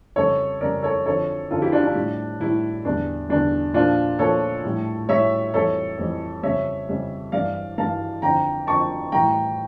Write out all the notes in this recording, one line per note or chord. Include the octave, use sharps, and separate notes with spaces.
F2 C#3 G3 A4 C#5
F2 C#3 G3 A#4 D5
A4 C#5
F2 D3 F3 A4 C#5
F2 D3 F3 F4 A4
E4 G4
D4 F4
D4
A2 G3
A2 G3 E4
E2 D3 G3 D4
E2 D3 G3 D4
A#2 F3 D4 F4
A#2 F3 A4 C#5
A2 G3
A2 G3 C#5 E5
F2 E3 G3 A4 C#5
F2 E3 G3
F2 C#3 G3 C#5 E5
F2 C#3 G3
G2 E3 G3 D5 F5
G2 E3 G3 F5 A5
F2 D3 F3 G5 A#5
F2 D3 F3 A5 C#6
A2 E3 G3 G5 A#5